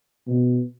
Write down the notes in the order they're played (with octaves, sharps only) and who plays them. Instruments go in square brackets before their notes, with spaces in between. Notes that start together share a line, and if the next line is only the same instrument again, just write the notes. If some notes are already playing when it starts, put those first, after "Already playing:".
[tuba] B2